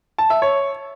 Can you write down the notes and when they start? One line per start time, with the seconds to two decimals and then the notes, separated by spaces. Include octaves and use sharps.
0.18 A5
0.30 E5
0.42 C#5